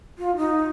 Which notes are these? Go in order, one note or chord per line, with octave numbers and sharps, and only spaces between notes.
F4
D#4